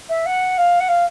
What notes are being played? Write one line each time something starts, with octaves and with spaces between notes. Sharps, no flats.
E5
F#5
F5
F#5
F5